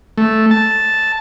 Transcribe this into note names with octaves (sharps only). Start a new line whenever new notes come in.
A3
A5